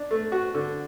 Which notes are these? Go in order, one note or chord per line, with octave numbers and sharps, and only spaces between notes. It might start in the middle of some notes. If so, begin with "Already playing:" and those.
Already playing: D4
A3
F#4
D3